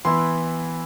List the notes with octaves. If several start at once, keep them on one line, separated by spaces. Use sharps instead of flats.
E3 B3 E4 C6